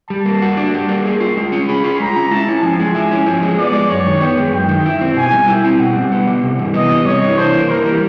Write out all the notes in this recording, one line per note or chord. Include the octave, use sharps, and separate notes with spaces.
G3 A5
A#3
F#4
D4
G3
A#3
G#4
F4
G#3
C#4
G#4 B5
F4
G#3 A#5
C#4
E4 A5
C#4
F3 G#5
G#3
E4
C#4
F3
G#3
B3 D5
G#3
F#2 C#5
D#3
B3 G5
G#3
F#2 G5
D#3
E4
C4
B2 G#5
G3
E4 G5
C4
B2 F#5
G3
B3
G3
C3
E3
B3 D#5
G3
C3 C#5
E3
D4 C5
A#3
E3 A#4
G3